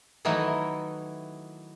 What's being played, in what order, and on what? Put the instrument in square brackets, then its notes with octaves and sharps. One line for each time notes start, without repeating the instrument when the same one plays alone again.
[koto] D#3 E3 F#3 A3 D#4 E4